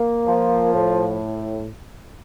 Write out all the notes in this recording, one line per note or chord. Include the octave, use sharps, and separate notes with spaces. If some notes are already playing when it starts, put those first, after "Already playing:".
Already playing: A#3
F3
A2